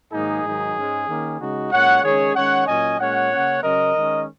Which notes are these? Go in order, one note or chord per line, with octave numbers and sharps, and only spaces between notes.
G#2 D#3 F#3 A#3 D#4 G#4
G#2 D#3 F#3 D#4
G#2 G#3 C#4
D#3 A#3 C#4
C#3 G#3 D#4 F#4
A#2 G#3 C#4 C#5 F#5
D#3 G#3 C#4 G#4 C#5
D#3 G#3 C#4 C#5 F#5
A#2 F#3 C#4 D#5 G#5
A#2 G#3 C#4 C#5 F#5
C#3 A#3 C#4
C#3 F#3 C#4 A#4 D#5
D#3 G#3 C#4